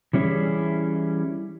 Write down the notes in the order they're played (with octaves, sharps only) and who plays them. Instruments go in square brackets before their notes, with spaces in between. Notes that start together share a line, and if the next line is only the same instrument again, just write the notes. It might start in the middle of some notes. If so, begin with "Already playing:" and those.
[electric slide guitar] E3 G3 C#4 E4 G#4